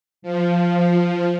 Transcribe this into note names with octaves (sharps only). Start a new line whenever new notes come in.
F3